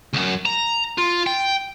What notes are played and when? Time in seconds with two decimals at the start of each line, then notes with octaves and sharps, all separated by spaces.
0.13 C#2 F#2
0.45 A#5
0.98 F4
1.27 G5